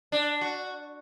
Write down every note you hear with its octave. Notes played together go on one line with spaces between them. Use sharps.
D4
F#4